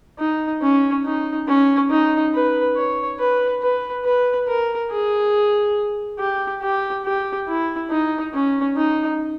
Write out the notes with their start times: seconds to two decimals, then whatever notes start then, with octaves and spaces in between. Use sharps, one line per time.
0.19 D#4
0.62 C#4
1.05 D#4
1.48 C#4
1.90 D#4
2.34 B4
2.76 C#5
3.19 B4
3.62 B4
4.05 B4
4.47 A#4
4.90 G#4
6.19 G4
6.62 G4
7.05 G4
7.48 E4
7.90 D#4
8.33 C#4
8.76 D#4